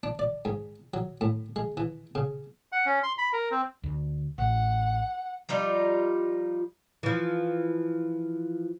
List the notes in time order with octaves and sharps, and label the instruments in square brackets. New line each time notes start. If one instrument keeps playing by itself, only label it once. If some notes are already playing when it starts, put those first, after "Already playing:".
[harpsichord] D4
D5
G#2
F#3
A2
G#3
E3
C#3
[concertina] F#5
C#4
C6
B5
A#4
C4
[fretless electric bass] D2
[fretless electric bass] A1 [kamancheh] F#5
[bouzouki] F3 G3 D#4 F4
[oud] E3 F3